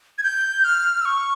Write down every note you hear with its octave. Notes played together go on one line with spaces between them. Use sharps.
G#6
G6
F6
E6
C#6